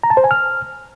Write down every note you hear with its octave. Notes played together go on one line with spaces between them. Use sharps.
A#5
A5
C5
G#5
F6